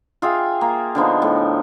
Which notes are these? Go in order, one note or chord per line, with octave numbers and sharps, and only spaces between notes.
F4 G#4 E5 G5
A#3
D3 F3 B3 D#4
A2